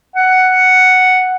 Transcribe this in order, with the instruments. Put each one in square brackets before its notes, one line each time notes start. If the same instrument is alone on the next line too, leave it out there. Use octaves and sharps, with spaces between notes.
[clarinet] F#5